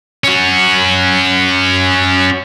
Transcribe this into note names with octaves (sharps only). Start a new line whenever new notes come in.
C#4 F#4